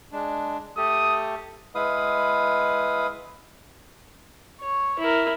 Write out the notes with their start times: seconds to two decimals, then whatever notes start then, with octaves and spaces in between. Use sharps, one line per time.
0.12 G#3 D4
0.77 A3 G4 A4 D#6
1.75 G#3 E4 B4 F5 D#6
4.61 C#5
4.99 E4 A#4